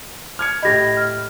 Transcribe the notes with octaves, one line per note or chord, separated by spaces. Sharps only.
F6 G#6 C#7
A2 G4 D#5 B5 G#6 A#6
F6